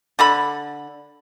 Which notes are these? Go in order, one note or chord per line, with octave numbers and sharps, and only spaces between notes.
D3 A4 B5